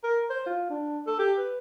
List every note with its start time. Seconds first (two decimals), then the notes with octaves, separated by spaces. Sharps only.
0.04 A#4
0.30 C5
0.46 F4
0.70 D4
1.07 A4
1.19 G4
1.38 B4